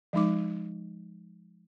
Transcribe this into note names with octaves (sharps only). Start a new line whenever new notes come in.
F3 G#3 D#4 D6